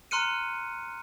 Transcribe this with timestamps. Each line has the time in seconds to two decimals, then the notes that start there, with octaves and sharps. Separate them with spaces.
0.11 A#5 C6 F6 F#6 C#7 D#7